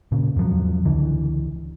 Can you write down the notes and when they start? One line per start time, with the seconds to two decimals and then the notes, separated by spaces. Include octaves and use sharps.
0.12 A#2 C#3
0.36 E2 G#2 F3 F#3
0.85 C#2 D3 E3